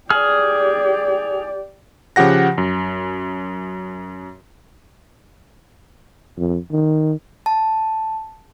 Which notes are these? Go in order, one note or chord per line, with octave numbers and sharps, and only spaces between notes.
G4 G#4 D5 F6
C#3 F3 G4 F#5 A#6
F#2
F2
D#3
A5